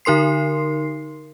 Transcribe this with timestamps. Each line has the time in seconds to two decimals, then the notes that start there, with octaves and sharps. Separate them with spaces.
0.05 D3 D#4 A#4 C6 C7